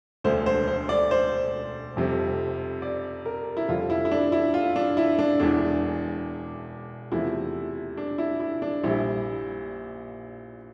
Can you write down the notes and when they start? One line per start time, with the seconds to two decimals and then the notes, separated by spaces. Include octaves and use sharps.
0.24 E1 D2 D3 C5
0.46 C5
0.68 C5
0.89 D5
1.11 C5
1.96 F1 F2 C3 G3
2.82 D5
3.26 A#4
3.57 E4
3.68 F1 F2 D3 G3 F4
3.90 E4
4.05 E4
4.11 D4
4.32 E4
4.54 F4
4.76 D4
4.97 E4
5.19 D4
5.40 E1 E2 E3 D4
7.12 E2 C3 F3 A3 E4
7.97 D4
8.18 E4
8.40 E4
8.62 D4
8.84 A#1 A#2 G3 E4